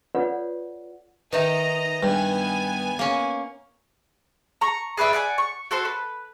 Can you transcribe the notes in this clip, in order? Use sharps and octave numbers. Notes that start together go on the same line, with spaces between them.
F4 A4 B4 C#5 D5 F#5
D#3 D#4 B4 D#5 E5 A#5
G2 B3 G#5
A#3 C#4
A#5 C#6
G#4 B4 D5 E5
D5 F#5 G#5
C#6
F#4 A4 C5 C6
B4